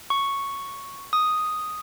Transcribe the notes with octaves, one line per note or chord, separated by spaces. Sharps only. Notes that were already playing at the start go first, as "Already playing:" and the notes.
C#6
D#6